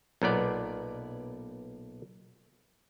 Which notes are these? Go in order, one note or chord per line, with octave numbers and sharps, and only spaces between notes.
B1 A#2 B3 D5